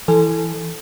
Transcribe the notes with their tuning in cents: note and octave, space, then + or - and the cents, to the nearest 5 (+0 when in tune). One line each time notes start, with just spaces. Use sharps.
E3 +0 A4 +0 G#5 +0